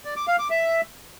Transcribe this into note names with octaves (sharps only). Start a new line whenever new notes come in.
D5
D6
F5
D6
E5